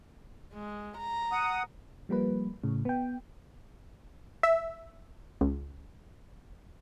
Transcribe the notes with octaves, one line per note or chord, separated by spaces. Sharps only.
G#3
A#5
F#5 D#6
F3 G3 A#3 B4
A2 C#3
B3 G5
E5
C#2